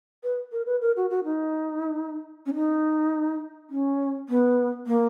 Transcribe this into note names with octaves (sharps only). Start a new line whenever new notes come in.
B4
A#4
B4
A#4
F#4
F#4
D#4
C#4
D#4
C#4
B3
A#3